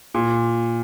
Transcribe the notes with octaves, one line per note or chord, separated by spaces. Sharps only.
A#2